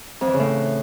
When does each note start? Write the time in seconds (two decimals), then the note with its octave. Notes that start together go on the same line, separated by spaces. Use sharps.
0.21 F2
0.27 E3
0.34 C#3
0.40 A2